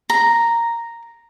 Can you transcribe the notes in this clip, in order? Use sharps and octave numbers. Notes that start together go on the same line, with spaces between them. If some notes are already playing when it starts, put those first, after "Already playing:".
A#5